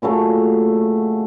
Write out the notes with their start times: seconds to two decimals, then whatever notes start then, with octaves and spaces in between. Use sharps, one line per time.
0.02 A#2 C#3 F#3 A3